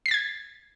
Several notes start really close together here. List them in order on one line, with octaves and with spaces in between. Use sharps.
C7 B6 A6 G#6